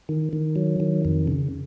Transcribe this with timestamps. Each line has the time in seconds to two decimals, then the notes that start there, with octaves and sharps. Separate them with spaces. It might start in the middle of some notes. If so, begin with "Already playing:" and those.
0.09 D#3
0.33 D#3
0.56 F#3
0.80 D#3
1.05 F2
1.27 C#3